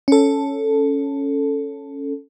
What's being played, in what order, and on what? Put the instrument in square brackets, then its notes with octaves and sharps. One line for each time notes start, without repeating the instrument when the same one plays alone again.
[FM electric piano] C#4 A4